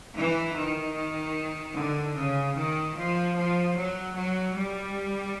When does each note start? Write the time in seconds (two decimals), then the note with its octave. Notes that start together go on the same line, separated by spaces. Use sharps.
0.16 E3
0.56 D#3
1.76 D3
2.16 C#3
2.56 D#3
2.97 F3
3.37 F3
3.76 F#3
4.17 F#3
4.56 G3